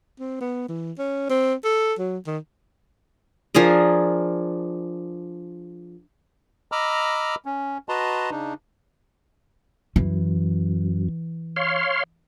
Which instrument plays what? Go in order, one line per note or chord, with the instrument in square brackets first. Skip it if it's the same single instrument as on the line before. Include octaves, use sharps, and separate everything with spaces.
[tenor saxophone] C4
B3
E3
C#4
C4
A4
F#3
D#3
[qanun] F3 D4 G#4 A#4
[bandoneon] D#5 A#5 B5 D6 E6 F6
C#4
F#4 B4 D#5 A5 A#5 C6
C#3 D4 D#4
[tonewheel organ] F#2 [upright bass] E3
[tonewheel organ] C#5 F5 C6